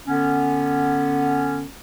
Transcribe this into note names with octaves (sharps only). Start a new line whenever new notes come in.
D3 B3 C#4